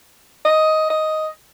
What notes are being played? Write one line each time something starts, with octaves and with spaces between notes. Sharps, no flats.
D#5
D#5